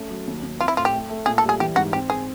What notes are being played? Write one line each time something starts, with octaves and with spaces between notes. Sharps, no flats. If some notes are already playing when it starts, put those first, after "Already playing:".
Already playing: A3 C#4
F#3
D#2
D#2
C4 F4
E4
A2 F4
G4
A3
A3
A#2 G#4
A4
G3
G#4
E3 G4
G#2 F#4
C4 G4
C4 G#4